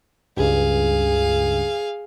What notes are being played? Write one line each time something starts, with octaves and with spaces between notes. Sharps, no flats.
C#2 G2 G#4 F5